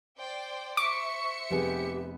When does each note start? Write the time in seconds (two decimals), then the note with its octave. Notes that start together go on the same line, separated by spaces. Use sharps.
0.18 C5 D5 G5
0.77 C5 E5 C#6 D6 C#7
1.50 F1 B3 G4 G#4